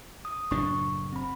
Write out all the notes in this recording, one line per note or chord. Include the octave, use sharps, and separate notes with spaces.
D#6
F#1 A2 D4 C#6
C4 B5